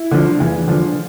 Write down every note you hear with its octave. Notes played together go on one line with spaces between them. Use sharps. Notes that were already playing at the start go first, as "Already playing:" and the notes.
Already playing: E4
D3 F3
E2
D3 F3